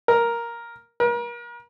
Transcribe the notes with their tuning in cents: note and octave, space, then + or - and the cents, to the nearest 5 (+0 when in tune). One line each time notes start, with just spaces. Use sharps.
A#4 +5
A#4 +40